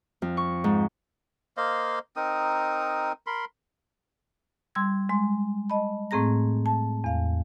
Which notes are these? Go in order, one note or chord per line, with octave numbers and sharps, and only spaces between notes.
F2
C#6
G#2
A#3 C5 D#5 F5
C4 D#4 A#4 D#6
A#4 B5 C6
G3 C6 E6 G#6
G#3 C6
D#5 A5 B5
A2 A3 C4 G#4 A#5 A#6
A5
E2 F5